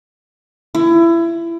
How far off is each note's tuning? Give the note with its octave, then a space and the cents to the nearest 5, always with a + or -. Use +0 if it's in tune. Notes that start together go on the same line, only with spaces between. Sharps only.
E4 +25